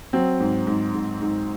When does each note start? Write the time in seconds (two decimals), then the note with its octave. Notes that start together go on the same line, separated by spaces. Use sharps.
0.13 F#3 C4
0.40 G#2
0.67 G#2
0.94 G#2
1.22 G#2